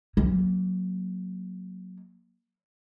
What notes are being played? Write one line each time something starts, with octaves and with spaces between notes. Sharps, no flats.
F#3 A#3